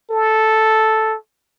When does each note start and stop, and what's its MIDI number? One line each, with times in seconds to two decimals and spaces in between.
0.11 1.16 69